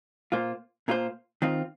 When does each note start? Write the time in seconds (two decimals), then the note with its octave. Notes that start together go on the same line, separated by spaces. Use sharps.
0.32 A#2 A#3 F4 C5
0.88 A#2 A#3 F4 C5
1.42 D#3 C4 F4